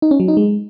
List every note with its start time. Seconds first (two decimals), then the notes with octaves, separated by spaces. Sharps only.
0.02 D#4
0.11 C#4
0.20 F#3
0.28 D#4
0.37 G#3